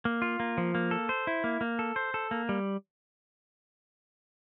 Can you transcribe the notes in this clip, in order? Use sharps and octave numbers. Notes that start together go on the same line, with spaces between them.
A#3
F4
A#3
F3
A#3
A4
C5
E4
A#3
A#3
A4
C5
A4
A#3
G3